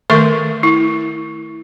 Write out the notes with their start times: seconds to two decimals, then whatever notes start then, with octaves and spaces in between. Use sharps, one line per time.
0.10 D#3 A3 A4 A#4 E5 C#6
0.63 E4